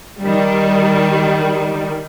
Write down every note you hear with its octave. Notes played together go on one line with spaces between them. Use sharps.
D#3 G3